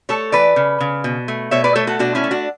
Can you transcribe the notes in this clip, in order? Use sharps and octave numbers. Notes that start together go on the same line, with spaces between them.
A3 A4 C#5
E3 B4 D5
C#3
C#3
B2
A3
B2 C#5 E5
B4 D5
A3 A4 C#5
F#4 A4
B2 D4 F#4
C#4 E4
A3
D4 F#4